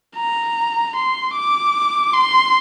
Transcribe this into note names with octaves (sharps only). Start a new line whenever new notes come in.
A#5
C6
D6
C6